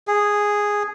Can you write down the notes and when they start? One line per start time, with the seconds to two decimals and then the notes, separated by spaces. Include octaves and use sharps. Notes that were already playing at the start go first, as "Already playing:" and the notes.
0.08 G#4